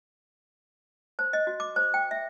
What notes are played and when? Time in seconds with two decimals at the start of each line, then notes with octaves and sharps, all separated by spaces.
1.19 C5
1.33 D#5
1.47 F#4
1.60 D6
1.76 C5
1.94 G5
2.11 E5